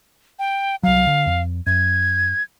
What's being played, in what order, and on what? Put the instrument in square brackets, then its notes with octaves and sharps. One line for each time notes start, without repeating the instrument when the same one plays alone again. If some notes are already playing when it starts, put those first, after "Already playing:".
[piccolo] G5
[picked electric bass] C2 F#3 [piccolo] F5
[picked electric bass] D3
F2
[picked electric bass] F#2 [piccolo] G#6